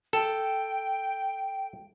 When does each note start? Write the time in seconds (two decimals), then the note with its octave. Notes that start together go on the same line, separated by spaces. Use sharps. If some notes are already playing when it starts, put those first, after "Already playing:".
0.13 A4 G5